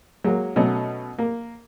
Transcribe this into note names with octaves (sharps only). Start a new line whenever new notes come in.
F#3 G#3 A#3
B2 F#3 A3 C#4
A#3